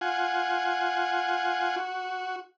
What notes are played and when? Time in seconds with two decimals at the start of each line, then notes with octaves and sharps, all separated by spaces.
0.01 F4 F#5 G#5
1.76 F#4